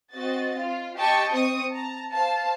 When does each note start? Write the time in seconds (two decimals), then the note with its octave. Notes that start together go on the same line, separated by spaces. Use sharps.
0.12 C4 F#4 D#5 A6
0.56 F4
0.96 G4 D#5 G5 A5 C#6
1.31 C4 C#6 D#6
1.71 A5 A#5
2.13 C5 F5 A5